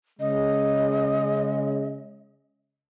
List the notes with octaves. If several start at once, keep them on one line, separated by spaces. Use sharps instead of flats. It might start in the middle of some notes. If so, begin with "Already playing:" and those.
C#3 G#3 D#5